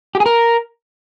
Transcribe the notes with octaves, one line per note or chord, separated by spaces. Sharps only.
G4
G#4
A#4